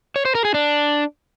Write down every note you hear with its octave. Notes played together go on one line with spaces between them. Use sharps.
C#5
C5
A#4
G#4
D4